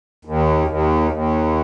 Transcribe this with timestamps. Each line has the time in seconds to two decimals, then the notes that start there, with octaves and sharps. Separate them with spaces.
0.25 D#2
0.68 D#2
1.11 D#2